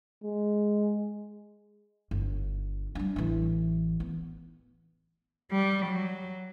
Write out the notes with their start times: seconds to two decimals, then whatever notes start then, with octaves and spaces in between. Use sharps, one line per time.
0.24 G#3
2.11 G1
2.95 G3 D4
3.16 A1 E3
4.00 B3
5.51 G3
5.87 F#3